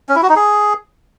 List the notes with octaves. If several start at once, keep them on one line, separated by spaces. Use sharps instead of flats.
C#4
E4
F#4
D#4
G#4